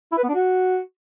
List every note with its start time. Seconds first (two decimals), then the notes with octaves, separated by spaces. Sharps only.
0.12 E4
0.18 B4
0.23 B3
0.29 D4
0.34 F#4